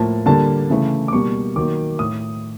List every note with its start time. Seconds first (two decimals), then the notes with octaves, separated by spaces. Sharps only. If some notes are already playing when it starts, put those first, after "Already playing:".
Already playing: A2 F3 A#3 A5
0.26 D3 G3 A#3 A5
0.70 C#3 E3 A3
1.08 D6
1.13 B2 G3 A#3 C#6
1.56 D#3 F#3 A#3 D6
1.99 A2 D#6